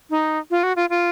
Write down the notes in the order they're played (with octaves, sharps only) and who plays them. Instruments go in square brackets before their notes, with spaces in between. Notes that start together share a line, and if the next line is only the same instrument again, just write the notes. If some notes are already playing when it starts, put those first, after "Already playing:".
[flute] D#4
F4
F#4
F4
F4